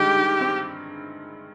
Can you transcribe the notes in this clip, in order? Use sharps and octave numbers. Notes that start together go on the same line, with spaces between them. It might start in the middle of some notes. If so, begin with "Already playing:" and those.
Already playing: G2 D#3 G#3 G4
D#3
C4